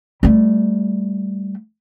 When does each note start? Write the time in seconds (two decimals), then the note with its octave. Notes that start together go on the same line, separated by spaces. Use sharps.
0.23 G3 A3